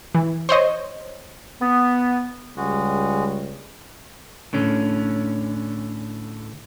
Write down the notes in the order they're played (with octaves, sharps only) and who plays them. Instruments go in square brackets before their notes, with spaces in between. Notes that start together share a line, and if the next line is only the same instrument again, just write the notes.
[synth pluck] E3
C5 C#5 D#5
[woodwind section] B3
[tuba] C#2 [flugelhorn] G3 [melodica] G#3 F#4
[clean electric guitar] A2 D3 C#4